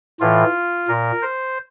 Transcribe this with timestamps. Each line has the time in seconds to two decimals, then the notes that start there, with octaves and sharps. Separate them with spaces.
0.20 A2 E3 F4
0.88 A#2 A#4
1.23 C5